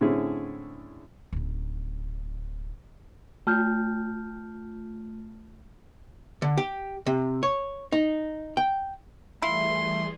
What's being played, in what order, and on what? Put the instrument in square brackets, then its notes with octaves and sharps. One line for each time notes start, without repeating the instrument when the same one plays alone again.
[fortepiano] A2 D3 C4 C#4 E4 G#4
[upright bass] D1 D#4
[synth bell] A3 F4 [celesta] A5 F6 G6
[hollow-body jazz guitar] D3
G4
C3
C#5
D#4
G5
[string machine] E3 G3 G#4 [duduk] A3 [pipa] E4 F4 [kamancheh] C6